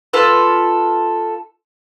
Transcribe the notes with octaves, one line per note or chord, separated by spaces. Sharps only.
F4 A4 B4